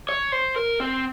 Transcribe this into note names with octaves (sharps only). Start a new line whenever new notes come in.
C#5
C5
A#4
C4